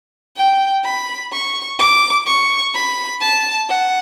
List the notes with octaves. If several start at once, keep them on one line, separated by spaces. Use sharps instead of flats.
G5
B5
C#6
D6
C#6
B5
A5
F#5